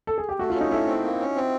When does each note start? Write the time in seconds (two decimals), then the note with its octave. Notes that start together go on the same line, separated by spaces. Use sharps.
0.07 A4
0.18 G#4
0.29 G4
0.39 A3 F#4
0.50 F4
0.55 C#4
0.61 D#4
0.71 A3 E4
0.88 C4
1.04 A#3
1.20 C#4
1.36 C4